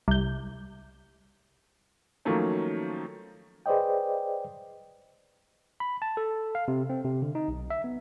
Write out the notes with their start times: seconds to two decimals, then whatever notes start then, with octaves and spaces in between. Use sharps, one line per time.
0.08 C2 G6
2.25 D#3 F3 F#3 A3 A#3 C#4
3.66 G#4 B4 C5 D5 D#5 G5
5.80 B5
6.02 A5
6.17 A4
6.55 F5
6.68 C3
6.90 C4
7.05 C3
7.22 D3
7.35 D#4
7.48 B1
7.70 E5
7.84 B3